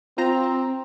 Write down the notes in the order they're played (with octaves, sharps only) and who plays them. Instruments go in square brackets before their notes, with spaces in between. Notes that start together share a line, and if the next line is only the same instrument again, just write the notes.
[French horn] C4 [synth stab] F4 C5 A#5